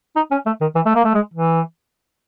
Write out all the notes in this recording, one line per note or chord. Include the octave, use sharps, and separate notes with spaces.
D#4
C#4
A3
D#3
E3
A3
A#3
A3
G#3
E3